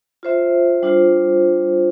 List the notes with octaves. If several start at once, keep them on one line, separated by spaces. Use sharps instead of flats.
F4 C5 E5
G3 D4 F4 C5